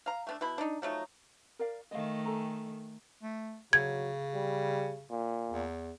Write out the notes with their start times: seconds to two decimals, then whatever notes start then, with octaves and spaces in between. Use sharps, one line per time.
0.06 F5 A#5
0.27 A3 B3 D4
0.41 B2 E4 B5
0.58 D4 D#4
0.82 F3 F#3 A3 D#4
1.59 A#4 D5 F5
1.91 D#3 A3 D#5 F5
2.25 A4 G#5 A#5
3.23 A3
3.73 C#3 F#3 G#6
4.34 G3
5.11 A#2
5.50 E2